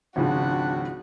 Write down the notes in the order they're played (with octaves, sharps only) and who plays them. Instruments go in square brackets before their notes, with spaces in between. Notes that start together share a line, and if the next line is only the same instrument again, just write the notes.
[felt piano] G#1 C#2 F3 [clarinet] D4 [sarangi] F#4